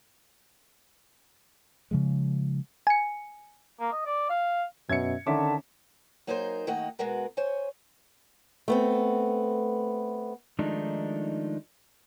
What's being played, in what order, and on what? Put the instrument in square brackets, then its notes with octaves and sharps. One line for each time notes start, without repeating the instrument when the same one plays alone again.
[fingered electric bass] C#3 F3 G#3
[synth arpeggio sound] G#5 C#7
[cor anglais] A#3
D#5
D5
F5
[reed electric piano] F#2 C#4 E5 [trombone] B2 [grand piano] G#6 C#7
[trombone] D3 [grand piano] D#3 E5 D6 [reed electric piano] C#4 [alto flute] A5
[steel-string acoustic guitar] F#3 A#3 D#4 G#4 A#4 C5
D#3 A3 A#3 G4 D#5 F#5
B2 G#3 B3 F#4 A#4
C5 C#5 G#5
A3 B3 C4
[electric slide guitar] D#3 F3 G#3 A3 D4 D#4